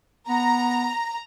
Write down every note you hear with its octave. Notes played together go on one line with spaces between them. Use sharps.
B3 A#5